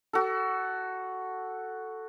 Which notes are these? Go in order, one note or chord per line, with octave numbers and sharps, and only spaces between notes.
F#4 A4